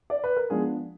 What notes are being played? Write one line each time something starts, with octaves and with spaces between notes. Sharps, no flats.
D5
B4
A#4
F3 G#3 B3 D4 G#4